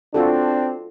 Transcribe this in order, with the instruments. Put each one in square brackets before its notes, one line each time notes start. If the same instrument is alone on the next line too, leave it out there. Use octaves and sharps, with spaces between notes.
[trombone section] C4 D4 [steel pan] F4 F#4 A4